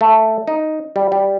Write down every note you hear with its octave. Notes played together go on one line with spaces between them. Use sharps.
A3
D#4
G3
G3